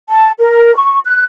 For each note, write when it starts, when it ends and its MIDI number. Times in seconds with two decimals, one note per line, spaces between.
0.09 0.31 81
0.40 0.75 70
0.77 1.00 85
1.06 1.24 90